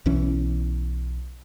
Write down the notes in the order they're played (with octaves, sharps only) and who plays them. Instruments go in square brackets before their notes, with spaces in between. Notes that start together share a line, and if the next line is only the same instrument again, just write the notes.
[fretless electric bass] B1 E3 C#4